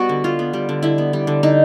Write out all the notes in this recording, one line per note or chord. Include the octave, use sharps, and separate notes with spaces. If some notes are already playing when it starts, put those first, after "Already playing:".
Already playing: G3 B3 F#4
D3
D3 F4
B3
G3
D3
D3 E4
B3
G3
D3
D3 D#4